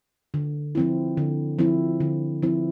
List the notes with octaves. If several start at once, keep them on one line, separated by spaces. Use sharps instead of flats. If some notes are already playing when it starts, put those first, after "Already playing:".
D3
F3 C4 E4
D3
F3 C4 E4
D3
F3 C4 E4